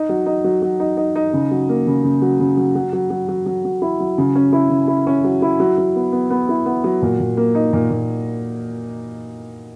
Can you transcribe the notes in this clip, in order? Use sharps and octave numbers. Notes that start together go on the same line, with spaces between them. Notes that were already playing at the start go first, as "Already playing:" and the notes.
Already playing: D#4
F#3
D#4
F#3
F#3
D#4
D#4
D#4
C#3
F#3
A#3
C#3
C#3
F#3
C#3
F#3
F#3
F#3
F#3
F#3
F#3
F#3
E4
F#3
C#3
C#4
E4
C#3
E4
C#4
F#3
E4
F#3
F#3
B3
B3
B3
E4
B3
F#3
A#2
A#2
A#3
D#4
A#2
A#2